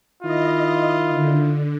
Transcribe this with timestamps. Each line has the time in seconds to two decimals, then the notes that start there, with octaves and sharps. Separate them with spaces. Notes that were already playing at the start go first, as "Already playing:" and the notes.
0.23 D#3 E4 F4 D#5
1.09 D3